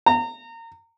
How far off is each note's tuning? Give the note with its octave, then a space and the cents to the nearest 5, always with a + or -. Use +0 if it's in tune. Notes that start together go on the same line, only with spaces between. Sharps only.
A#5 -30